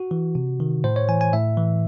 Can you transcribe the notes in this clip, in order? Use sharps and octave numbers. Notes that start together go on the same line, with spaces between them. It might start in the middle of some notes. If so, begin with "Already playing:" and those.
Already playing: F#4
E3
C3
D#3
A2 C5
C#5
E3 G#5
G#5
A2 E5
E3